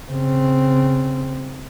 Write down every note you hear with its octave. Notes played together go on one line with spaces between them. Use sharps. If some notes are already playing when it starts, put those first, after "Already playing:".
C#3 C4